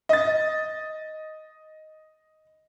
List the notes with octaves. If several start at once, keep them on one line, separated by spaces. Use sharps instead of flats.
D#5 A6